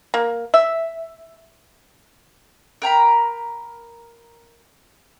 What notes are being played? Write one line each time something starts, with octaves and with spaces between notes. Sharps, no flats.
A#3
E5
A#4 G5 A#5 B5